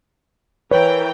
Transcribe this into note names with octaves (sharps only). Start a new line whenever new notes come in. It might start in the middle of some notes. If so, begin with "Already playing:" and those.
E3 A#4 B4 C#5 G5